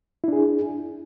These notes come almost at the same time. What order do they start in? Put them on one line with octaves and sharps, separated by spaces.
E4 D4 G#4